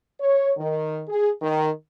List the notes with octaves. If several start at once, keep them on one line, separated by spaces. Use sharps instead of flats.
C#5
D#3
G#4
D#3